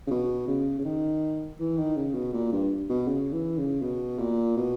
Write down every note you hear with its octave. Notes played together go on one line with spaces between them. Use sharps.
C#3
B2
C#3
C#3
D#3
E3
D#3
C#3
B2
A#2
G2
B2
C#3
E3
C#3
B2
A#2
B2